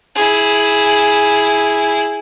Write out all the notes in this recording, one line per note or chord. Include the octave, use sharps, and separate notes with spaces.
E4 G#4